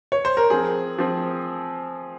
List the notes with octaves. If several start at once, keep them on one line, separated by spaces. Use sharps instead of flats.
C#5
C5
A#4
F3 C4 G#4
F3 C4